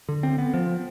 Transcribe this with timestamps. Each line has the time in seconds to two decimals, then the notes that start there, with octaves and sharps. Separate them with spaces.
0.09 D3
0.23 C4
0.38 B3
0.54 F3